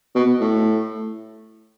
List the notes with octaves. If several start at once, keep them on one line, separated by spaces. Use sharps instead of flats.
B2
A2